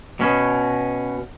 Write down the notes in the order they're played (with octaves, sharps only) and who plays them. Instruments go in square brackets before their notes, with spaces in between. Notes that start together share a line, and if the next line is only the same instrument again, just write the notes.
[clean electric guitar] B2 C#4